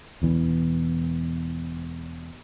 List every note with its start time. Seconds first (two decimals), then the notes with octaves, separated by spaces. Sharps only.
0.22 E1 E2 E3